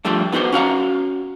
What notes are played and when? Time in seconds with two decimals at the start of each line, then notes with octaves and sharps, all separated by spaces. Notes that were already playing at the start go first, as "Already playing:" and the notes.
0.05 G2 F3 G3 A3 D4
0.32 B3 D#4 F#4 G4 C5
0.52 C#4 F#4 F5 A#5